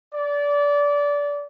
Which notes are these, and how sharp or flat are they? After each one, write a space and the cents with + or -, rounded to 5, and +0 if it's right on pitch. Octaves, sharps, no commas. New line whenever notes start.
D5 -25